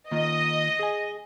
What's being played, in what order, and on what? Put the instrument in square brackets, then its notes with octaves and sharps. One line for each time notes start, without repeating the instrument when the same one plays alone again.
[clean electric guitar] D#3 A#3 F4 [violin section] D#5
[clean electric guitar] G#4 G#5